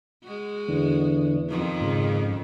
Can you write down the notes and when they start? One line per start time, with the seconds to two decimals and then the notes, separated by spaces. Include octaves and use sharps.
0.24 G#3 F#4
0.69 E2 D3
1.49 F2 D#3 F3
1.81 G#2 C#3